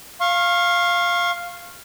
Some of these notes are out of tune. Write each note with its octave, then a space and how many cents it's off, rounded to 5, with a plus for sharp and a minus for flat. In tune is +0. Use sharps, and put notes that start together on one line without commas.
F5 +0 C#6 -35